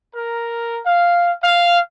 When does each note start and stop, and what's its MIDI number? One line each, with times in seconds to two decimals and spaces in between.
0.15 0.80 70
0.86 1.32 77
1.43 1.80 77